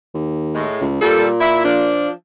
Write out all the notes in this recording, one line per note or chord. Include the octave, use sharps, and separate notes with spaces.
D#2
A2 G#3
C#2
A#2 G3 A4
E4
F3 D4